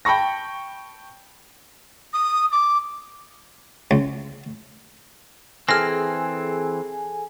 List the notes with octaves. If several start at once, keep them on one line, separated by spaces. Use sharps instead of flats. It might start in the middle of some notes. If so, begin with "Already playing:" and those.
G5 A5 B5 C#6 A#6
D#6
D6
C#2
E3 C4 G#4 A4 G#5 F6 A#6